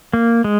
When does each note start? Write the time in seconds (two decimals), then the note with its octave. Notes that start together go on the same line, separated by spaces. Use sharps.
0.13 A#3
0.44 G#3